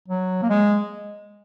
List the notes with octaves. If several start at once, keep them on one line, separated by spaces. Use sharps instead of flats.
F#3
A#3
G#3